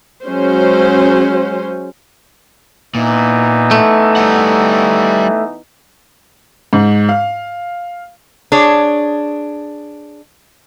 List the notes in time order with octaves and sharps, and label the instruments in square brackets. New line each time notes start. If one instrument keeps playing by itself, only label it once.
[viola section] F#3 G#3 C#4 C5
[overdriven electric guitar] A#2 [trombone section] E3 B3 D#4
[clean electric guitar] A3
[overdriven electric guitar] G3 F#5
[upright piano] G#2
F5
[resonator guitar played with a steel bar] D4 G#4 C#5